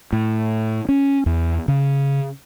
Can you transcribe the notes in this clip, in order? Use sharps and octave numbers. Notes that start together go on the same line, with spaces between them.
A2
C#4
E2
C#3